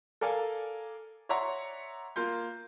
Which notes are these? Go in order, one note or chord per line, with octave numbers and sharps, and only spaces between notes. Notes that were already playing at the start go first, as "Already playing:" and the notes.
A4 A#4 D5 F5 G#5
C#5 D5 E5 F#5 A#5 C6
A#3 F4 C6 G6